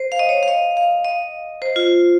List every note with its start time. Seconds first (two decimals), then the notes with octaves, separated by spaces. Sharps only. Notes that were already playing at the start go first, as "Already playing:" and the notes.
Already playing: C5
0.12 F5
0.19 D#5
0.29 C#5
0.43 F5
0.48 D#5
0.77 F5
1.05 D#5
1.62 C5
1.76 F4